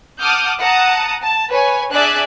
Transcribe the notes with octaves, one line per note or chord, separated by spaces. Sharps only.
F#5 A5 D6 D#6 F6 G6
F#5 A5 A#5 D#6
A5
B4 C#5 G#5
D4 G#4 D5 E5 G#5 F#6